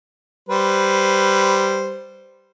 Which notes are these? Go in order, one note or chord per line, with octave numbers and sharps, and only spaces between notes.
G3 B4 C5